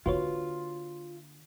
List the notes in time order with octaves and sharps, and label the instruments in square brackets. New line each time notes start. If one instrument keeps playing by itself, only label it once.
[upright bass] D3 A#3 [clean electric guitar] F4 [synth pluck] F#4 B4 C#5